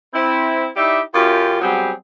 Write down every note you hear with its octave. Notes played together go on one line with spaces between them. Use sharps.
C4 E4
D#4 E4 G4 D5 E5
F#2 F4 G4
F#3 G3 B3 C4 G4 G#4